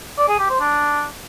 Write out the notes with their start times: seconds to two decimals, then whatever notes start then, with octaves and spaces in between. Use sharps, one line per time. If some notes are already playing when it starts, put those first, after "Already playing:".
0.18 D5
0.28 G#4
0.39 G4
0.50 C5
0.60 D4